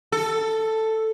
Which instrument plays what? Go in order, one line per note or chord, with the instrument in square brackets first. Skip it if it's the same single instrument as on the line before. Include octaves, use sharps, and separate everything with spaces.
[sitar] A4